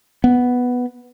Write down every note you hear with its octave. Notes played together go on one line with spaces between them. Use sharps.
B3